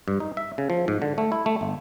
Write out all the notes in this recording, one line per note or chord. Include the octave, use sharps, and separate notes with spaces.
G2
D#4
E5
C#3
F3
G#2
D3
A3
E4
A3
G1